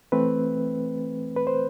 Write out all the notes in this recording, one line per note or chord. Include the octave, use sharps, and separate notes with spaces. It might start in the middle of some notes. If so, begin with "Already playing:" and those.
E3 A3 C4 B4
B4
C5